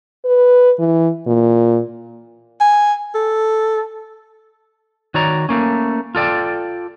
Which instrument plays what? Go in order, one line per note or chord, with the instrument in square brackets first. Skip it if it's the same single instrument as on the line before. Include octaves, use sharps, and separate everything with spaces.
[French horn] B4
E3
A#2
[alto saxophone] G#5
A4
[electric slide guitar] D#3 F#4 C#5 D5 A#5
A3 A#3 C#4
F4 A4 D5 G5